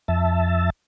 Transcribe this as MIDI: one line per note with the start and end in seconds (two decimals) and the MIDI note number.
0.08 0.70 41
0.08 0.70 76
0.08 0.70 81